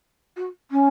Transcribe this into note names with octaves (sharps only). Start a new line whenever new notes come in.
F#4
C#4